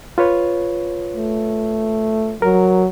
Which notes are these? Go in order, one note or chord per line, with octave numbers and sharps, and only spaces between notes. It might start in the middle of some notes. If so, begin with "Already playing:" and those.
F4 B4 C#5
A3
F#3 A#4